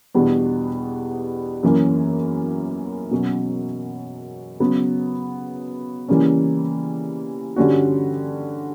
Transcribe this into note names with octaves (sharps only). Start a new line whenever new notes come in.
E2 B2 G3 B3 D4
F#2 E3 A#3 C#4
B2 F#3 C#4
C#3 F#3 B3
C#3 E3 G3 A#3 C#4
G2 D3 G3 C#4 F#4